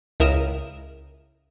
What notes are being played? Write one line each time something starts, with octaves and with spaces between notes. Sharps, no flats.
C#2 E4 A#4 D#6 E7